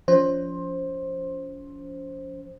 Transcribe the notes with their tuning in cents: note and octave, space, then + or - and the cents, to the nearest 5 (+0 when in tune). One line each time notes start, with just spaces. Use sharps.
F3 +0 C#4 +35 C5 +15